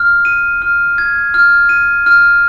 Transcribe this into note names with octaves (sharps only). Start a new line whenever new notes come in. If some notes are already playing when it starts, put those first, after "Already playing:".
Already playing: F6
D#7
F6
G#6
F6
D#7
F6